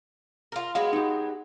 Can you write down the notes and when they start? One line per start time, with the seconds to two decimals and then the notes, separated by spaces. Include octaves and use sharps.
0.52 F4 A#4
0.75 F#3 G#3 B3 F5
0.93 D#4 G4